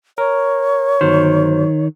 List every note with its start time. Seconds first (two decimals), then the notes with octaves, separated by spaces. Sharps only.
0.18 A#4 C#5
1.01 G1 D#3 F#3 C5